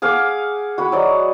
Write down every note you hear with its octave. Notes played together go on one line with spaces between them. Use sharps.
G#4 F5 F#5 D6
F#4 B5
F#3 D5 D#5